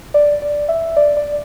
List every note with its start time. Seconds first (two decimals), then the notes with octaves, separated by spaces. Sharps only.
0.14 D5
0.42 D5
0.68 E5
0.96 D5
1.17 D5